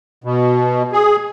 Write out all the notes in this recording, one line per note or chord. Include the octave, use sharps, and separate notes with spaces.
B2
G#4